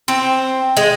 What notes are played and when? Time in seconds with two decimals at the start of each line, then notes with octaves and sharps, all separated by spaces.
0.08 C4
0.77 G#3